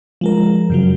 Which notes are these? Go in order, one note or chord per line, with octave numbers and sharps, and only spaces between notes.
F3 G#3 A#4
F#2 C#3 F#3